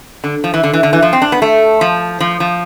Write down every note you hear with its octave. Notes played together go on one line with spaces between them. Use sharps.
D3
F3
E3
D3
E3
D3
E3
F3
C4
D4
B3
A3
F3
F3
F3